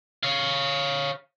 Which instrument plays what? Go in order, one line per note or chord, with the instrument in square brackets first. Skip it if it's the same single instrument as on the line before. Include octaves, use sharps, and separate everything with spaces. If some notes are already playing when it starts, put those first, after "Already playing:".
[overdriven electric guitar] C#5 F5